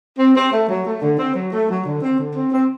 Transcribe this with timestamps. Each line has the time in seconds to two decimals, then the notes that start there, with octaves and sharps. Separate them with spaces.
0.19 C4
0.35 C4
0.52 A3
0.69 F#3
0.85 A3
1.02 D3
1.19 C4
1.35 F#3
1.52 A3
1.69 F#3
1.86 D3
2.02 C4
2.19 D3
2.36 C4
2.53 C4